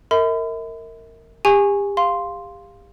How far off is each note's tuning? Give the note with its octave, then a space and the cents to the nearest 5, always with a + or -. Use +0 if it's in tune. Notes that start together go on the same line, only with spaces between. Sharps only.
A#4 -25 E5 -45 B5 +40
G4 +35 G#5 -5 C#6 -15
F5 +0 C6 +0